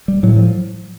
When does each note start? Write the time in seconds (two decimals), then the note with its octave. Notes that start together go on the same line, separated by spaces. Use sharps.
0.08 G3
0.23 A2 F#3
0.37 F3